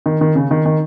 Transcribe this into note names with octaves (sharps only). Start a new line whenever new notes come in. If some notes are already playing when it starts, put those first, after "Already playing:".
D#3
D#3
C#3
D#3
D#3